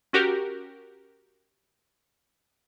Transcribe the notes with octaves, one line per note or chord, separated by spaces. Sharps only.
C#4 F#4 G4 A#4